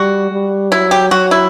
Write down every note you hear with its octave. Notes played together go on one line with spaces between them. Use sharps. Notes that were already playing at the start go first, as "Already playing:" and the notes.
Already playing: G3 F#4
G3
F#3 E4
G4
F#3 F#4
E4